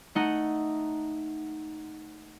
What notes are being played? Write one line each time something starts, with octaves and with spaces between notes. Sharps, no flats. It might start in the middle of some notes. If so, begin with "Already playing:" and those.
A3 D#4 F#5